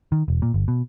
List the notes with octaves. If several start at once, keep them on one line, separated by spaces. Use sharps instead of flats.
D#3
E1
A#2
G1
B2